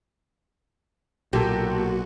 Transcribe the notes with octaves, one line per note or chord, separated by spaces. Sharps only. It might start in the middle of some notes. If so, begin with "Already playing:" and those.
B1 A#2 F#4 G4 A4